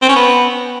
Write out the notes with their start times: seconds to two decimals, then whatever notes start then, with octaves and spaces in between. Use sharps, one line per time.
0.02 C4
0.09 C#4
0.16 B3